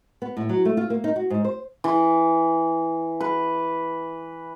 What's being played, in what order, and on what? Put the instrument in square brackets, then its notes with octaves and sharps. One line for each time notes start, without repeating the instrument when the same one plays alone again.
[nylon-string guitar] B3
A2
F#3
A3
F4
A#3
D#4
F#4
G#2
C5
[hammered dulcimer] E3
B4